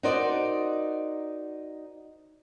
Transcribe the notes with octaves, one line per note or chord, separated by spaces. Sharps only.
D#4 F#4 A#4 C5 D5 D#5